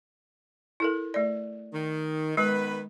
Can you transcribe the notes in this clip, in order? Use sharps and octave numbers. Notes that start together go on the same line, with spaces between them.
E4 A4 A#4
A3 D5
D#3
D#3 G#3 B3 B4